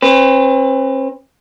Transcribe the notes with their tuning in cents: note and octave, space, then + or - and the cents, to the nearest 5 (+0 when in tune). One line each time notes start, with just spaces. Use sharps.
C4 +45 B4 +30